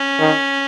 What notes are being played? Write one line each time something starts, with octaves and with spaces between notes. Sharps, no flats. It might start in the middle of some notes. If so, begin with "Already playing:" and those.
Already playing: C#4
D#3